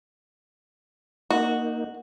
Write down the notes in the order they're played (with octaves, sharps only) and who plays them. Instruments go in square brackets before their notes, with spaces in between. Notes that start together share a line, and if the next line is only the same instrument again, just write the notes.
[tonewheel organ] A#3 D#4 [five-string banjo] F#4